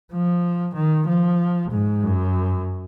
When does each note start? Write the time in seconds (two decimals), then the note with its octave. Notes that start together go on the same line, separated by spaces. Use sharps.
0.13 F3
0.76 D#3
1.08 F3
1.71 G#2
2.03 F#2